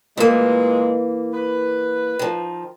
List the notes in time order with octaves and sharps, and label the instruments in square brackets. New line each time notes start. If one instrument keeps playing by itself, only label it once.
[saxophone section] A#2 G#3 [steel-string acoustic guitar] E3 A#3
[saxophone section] B4
[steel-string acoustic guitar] D#3 F3